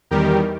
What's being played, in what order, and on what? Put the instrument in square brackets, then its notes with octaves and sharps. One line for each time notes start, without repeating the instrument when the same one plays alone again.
[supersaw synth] E2 D#3 G3 G4 A#4